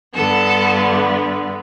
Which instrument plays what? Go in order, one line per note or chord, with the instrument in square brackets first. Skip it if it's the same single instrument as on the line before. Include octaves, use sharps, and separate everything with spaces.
[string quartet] G2 D3 B3 A4